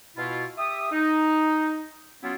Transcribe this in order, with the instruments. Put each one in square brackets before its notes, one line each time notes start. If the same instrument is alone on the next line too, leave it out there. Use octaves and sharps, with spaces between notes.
[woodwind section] B2 E4 F4
G4 E5 D#6
D#4
F#3 B3 C#4 E4 F4